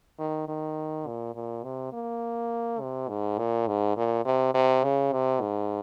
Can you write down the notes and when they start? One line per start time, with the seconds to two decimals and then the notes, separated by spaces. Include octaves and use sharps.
0.19 D#3
0.48 D#3
1.07 A#2
1.35 A#2
1.64 C3
1.93 A#3
2.81 C3
3.09 G#2
3.38 A#2
3.67 G#2
3.97 A#2
4.25 C3
4.54 C3
4.84 C#3
5.13 C3
5.41 G#2